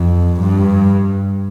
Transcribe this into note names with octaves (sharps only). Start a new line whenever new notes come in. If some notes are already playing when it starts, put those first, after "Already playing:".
Already playing: F2
G2